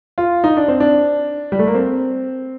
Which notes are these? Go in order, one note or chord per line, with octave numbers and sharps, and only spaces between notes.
F4
D#4
D4
C4
D4
G3
A3
A#3
C4